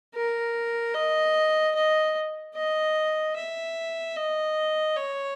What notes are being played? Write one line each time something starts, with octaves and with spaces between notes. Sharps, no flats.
A#4
D#5
D#5
D#5
E5
D#5
C#5